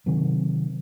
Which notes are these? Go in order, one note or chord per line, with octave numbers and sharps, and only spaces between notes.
C3 D#3 F#3